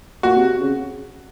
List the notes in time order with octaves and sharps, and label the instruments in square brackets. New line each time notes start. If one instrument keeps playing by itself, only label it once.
[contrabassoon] A#2 [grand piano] F#4
[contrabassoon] C3
C#3